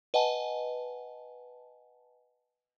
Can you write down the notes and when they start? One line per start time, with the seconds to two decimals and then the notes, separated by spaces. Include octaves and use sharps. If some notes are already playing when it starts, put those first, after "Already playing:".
0.14 B4 D#5 F#5 G#5 A5